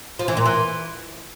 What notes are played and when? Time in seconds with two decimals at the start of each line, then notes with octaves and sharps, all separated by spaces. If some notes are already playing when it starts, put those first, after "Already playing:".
0.19 F3
0.28 E3
0.37 A#2
0.45 E3